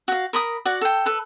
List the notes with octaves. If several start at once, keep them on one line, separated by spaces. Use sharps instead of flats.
F#4 F5
A#4 B5 D#6
F#4 D5 F#5
A4 G5
A4 B4